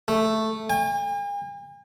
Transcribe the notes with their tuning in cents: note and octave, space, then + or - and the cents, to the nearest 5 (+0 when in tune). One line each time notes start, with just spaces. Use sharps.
A3 +0
G#5 -45